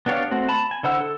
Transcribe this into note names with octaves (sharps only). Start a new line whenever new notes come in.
B3 D4 G4 C#5 F5
A3 C4 F#4
A5 B5
G#5
D3 E4 C5 F#5 E6
A4